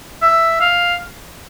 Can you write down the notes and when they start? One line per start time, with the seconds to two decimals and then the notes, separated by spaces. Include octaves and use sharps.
0.22 E5
0.61 F5